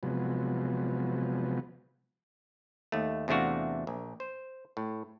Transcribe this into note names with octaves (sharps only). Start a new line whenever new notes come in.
C3 F3 F#3 G#3 B3
D#2 A3
E2 C3 A3 D4 F#4 F5
A#1
C5
A2